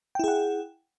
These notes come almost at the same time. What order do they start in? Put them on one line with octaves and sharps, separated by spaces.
G5 E4 G#4 F#5